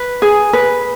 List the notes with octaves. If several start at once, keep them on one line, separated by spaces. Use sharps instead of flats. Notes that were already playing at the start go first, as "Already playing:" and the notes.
Already playing: B4
G#4
B4